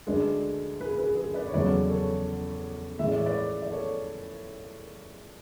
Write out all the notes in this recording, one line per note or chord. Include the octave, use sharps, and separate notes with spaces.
D2 D3 G#3 B4 D5
G#4 B4
G#4 B4
G#4 B4
B4 D5
C#5
E2 C#3 F#3 A3 B4 D5
A4 C#5
A2 E3 G#3 E5
D5
C#5
B4 D5
D5
A4 C#5